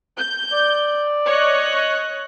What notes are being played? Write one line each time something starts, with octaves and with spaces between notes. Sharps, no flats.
G6
D5
C#5 D#5 F#6